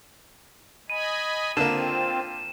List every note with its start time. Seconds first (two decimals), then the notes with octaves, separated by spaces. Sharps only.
0.90 D#5 G#5 B5 D#7
1.57 D3 A#3 C4 F4 E7